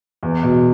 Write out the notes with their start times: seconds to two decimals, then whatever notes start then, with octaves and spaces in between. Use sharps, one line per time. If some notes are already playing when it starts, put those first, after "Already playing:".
0.23 E2
0.43 B2